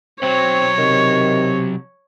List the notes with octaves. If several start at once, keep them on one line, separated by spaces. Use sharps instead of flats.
B1 F#3 C4 C#5
C3 D#3